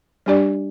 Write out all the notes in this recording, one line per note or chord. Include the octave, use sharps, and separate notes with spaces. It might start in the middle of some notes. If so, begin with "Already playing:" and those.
G3 D4 G4 D5